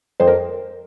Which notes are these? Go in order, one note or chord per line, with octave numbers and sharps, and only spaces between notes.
F2 C5
A#4